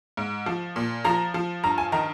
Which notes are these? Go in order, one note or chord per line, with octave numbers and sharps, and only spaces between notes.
G#2
F3
A#2
F3 A#5
F3
G2 A#5
G#5
D#3 A#5